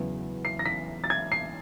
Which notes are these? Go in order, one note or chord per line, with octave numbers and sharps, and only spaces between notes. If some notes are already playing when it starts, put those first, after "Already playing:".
Already playing: E2 C#3 F#3 B3 E4
C7
A#6
B6
A6
G#6
C7